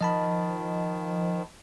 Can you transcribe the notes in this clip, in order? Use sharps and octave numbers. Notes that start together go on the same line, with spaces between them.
D#3 F3 D#5 A5 B5